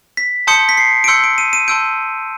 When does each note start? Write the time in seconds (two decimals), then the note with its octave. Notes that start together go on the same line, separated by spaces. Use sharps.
0.17 B6
0.47 A5 C6 D#6 G6 C#7
0.69 B6
0.77 C7
1.04 D7
1.08 C6 E6 G6 C#7
1.24 D7
1.38 D#7
1.53 D#7
1.68 A5 C6 E6 G6 D7